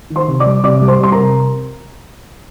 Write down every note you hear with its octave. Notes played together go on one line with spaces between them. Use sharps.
D#3
C5 C6
C3
D5 D6
G3
C3 D5 D6
G3
C5 C6
G3 C6
A#4 A#5
C3